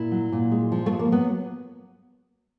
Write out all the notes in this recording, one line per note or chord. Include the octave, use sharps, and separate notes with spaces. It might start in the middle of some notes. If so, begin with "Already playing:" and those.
Already playing: A#2 E4
F#3
A#2
G#3
F3
A3
G#3
A#3
F#3 B3